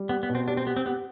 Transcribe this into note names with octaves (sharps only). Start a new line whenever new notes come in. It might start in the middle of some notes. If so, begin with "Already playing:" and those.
Already playing: G3
B3 G4
B3
B2
C4
D4 G4
C4
B3 G4
C4
B3 G4